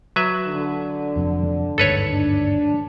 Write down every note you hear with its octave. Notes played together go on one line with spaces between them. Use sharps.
F#3 B4 E5
D3
F1 F2
G1 D#2 G#2 A4 B4 C#5
D4